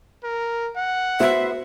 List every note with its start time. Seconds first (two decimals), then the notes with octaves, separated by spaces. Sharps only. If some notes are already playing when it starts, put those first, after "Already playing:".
0.24 A#4
0.76 F#5
1.20 B3 F#4 C5 E5